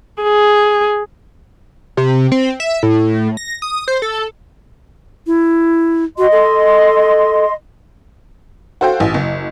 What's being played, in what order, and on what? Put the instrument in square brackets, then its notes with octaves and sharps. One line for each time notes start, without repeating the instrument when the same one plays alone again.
[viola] G#4
[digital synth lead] C3
C4
E5
A2
A#6
D#6
C5
A4
[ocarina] E4
[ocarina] F#4 [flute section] D#5 C6
[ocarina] A4
[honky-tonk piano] F#4 A4 C5 F5 G5
A1
F#1